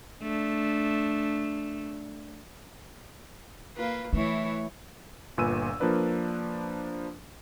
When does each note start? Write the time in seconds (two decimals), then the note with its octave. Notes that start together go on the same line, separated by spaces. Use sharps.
0.22 A3 D4
3.77 A#3 F4 B4
4.13 E3 A3 E4 C#5
5.38 G1 A#2 B4 G#5 E6 D#7
5.80 F3 A#3 D4 A#4 B4 D5